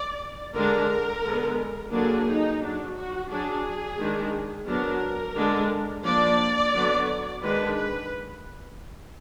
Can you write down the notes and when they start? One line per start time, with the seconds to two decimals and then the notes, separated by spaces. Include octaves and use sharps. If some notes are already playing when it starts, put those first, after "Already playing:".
Already playing: D5
0.54 D3 G#3 D4 A#4
1.23 D3 G#3 B3
1.92 D3 F#3 A#3 D4 G#4
2.26 D#4
2.62 F#3 D4
2.95 F#4
3.30 F#3 D4 G#4
3.99 D#3 G#3 D4
4.67 F#3 B3 D4 A#4
5.36 D3 G#3 D4
6.04 F3 A#3 D4 D5
6.73 D3 F#3 B3
7.43 D#3 G#3 D4 B4
7.77 B4